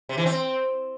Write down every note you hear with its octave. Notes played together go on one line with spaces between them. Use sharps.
C3
E3
C4